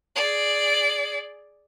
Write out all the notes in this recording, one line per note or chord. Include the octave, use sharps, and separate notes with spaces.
G#4 D5